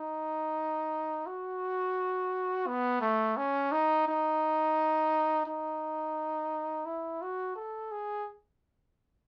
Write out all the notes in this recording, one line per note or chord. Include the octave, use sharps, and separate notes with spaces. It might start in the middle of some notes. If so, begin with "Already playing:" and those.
Already playing: D#4
F#4
B3
A3
C#4
D#4
D#4
D#4
E4
F#4
A4
G#4